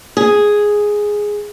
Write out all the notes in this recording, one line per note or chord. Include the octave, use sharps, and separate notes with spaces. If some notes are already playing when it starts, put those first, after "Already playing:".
G#4